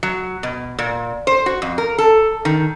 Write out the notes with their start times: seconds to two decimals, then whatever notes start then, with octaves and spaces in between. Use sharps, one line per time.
0.03 F#3
0.43 B2
0.79 A#2
1.27 C5
1.46 F#4
1.62 F2
1.78 A#4
1.98 A4
2.45 D#3